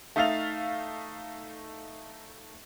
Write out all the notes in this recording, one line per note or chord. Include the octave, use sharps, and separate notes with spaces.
A3 D#4 E5 F5 A6 F7